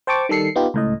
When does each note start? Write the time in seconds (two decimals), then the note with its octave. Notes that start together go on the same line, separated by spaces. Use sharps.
0.07 C5 G5 A5 C#6 D6
0.29 D#3 G3 A4 C7 C#7
0.56 B3 D#4 F4 G4
0.74 C#2 A2 D#5